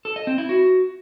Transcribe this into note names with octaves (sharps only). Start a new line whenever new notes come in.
A4
D#5
C4
E4
F#4